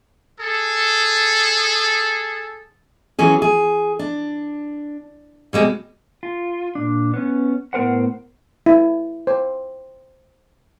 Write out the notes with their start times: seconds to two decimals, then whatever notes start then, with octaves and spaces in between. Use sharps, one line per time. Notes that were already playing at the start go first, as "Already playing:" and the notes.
0.40 G#4 A4
3.19 E3 F#3 C#4 G#4
3.42 G#4
3.99 D4
5.53 B2 G3 G#3 C4
6.23 F4
6.75 A#2 D4
7.14 B3 C#4
7.73 A2 B3 A#4 C5 F#5
8.66 E4
9.27 C5